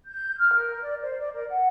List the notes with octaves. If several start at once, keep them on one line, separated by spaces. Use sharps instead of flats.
G6
F6
A#4
D5
C5
D5
A#4
F#5